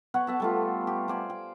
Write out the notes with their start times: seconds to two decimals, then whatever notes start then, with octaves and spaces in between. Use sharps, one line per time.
0.14 B3 C#5 F#5 C#6
0.27 B3 E5 A5
0.40 G3 A3 F4
0.87 G4
1.08 C5 D5 G#5
1.30 G5